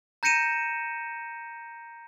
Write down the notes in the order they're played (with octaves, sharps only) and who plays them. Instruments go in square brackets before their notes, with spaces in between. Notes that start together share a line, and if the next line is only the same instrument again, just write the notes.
[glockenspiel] A#5 G6 A#6 C#7 D#7 E7